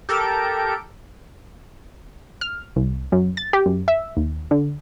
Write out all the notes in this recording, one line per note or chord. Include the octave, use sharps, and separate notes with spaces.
G4 A4 A#4 D7
F6
C2
F#2
A6
G4
F#2
E5
D#2
D3